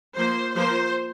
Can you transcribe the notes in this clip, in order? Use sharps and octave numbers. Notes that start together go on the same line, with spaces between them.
F3 A#3 C5
F3 A#3 C5